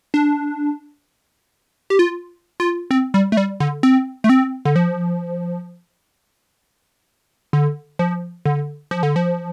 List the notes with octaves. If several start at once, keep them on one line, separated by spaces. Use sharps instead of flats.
D4
G4
F4
F4
C4
G3
A3
G3
D3
C4
A3
C4
D3
F3
D3
F3
D3
F3
D3
F3